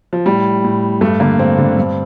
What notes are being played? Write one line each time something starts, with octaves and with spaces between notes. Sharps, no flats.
F3
A2 G3
A2
G2 A3
D3 A#3
G2 C4
D3
G2